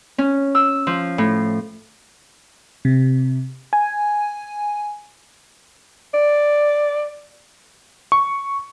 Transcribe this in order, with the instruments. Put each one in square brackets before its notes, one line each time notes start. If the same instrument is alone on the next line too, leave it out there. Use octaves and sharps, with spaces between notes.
[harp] C#4
E6
F3
A2
[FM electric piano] C3
G#5
[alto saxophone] D5
[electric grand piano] C#6